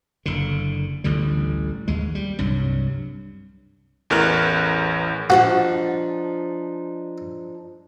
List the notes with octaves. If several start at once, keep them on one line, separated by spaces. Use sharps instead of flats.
F#1 D3
A1 D2 D3 G3
D#2 G#3
G3
C2 G2 F#3
A1 E2 A#4 F6 F#6
F3 D4 D#4 F#4